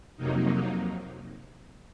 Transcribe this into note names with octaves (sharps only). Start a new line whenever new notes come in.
F2 C3 F#3 A#3 D#4